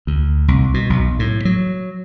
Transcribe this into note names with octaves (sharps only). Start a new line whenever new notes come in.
D2
C2
B2
B1
A2
F#3